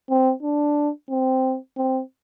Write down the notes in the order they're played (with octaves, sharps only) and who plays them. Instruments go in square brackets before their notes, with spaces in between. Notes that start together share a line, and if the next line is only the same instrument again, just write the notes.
[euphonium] C4
D4
C4
C4